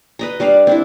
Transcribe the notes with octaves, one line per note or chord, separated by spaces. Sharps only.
B4 D#5 A#5
G3 D4 D5 F5
C4 D4 E4